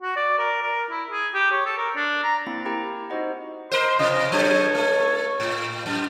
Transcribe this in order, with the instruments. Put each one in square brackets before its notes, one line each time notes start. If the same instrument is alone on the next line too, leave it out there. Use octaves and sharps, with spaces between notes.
[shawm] F#4
D5
A#4
A#4
E4
G#4
G4
C#5
A4
A#4
D4
A#5
[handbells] A#3 C4 E4 A6
E4 G4 A#4 G5 A#5
D#4 F#4 C5 D#5 F#5
[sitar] A#4 C5 [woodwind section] D#5 C6
[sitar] C3 C#4 [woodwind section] F3 D#5
[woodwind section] C#2 A4 C#5 [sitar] F#3 D4
[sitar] A3
A2
F#2